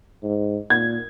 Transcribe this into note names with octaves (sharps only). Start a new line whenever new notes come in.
G#2
A#2 G#6